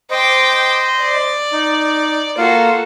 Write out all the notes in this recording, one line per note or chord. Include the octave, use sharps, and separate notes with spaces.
C5 D#5 G5 D6
D5
D#4
A#3 F4 F#4 A4 F5